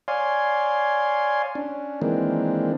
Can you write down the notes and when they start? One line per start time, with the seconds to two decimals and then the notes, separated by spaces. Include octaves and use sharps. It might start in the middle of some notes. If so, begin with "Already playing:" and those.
0.08 C#5 D5 F5 G#5 C6
1.55 C#4 D4
2.02 D#3 E3 G#3 A#3 C4 D4